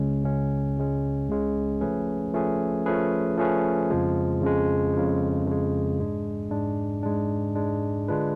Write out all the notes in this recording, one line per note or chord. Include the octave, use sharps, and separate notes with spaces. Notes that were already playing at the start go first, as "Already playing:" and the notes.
Already playing: C#2 C#3 G#3 C#4
C#2 C#3 G#3 C#4
C#2 C#3 G#3 C#4
C#2 C#3 G#3 C#4
F3 A3 C#4 G#4 B4
F3 A3 C#4 G#4 B4
F3 A3 C#4 G#4 B4
F3 A3 C#4 G#4 B4
F2 C#3 F3 G#3
F2 C#3 F3 G#3
F2 C#3 F3 G#3
F2 C#3 F3 G#3
G#2 G#3 D4
G#2 G#3 D4
G#2 G#3 D4
G#2 G#3 D4
D3 G#3 D4 F4 B4